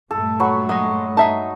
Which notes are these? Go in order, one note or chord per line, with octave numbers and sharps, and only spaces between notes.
G2 A#2 A3 A4
F#3 B5 C#6
F#3 G#3 D#5
D#4 G#4 E5 A5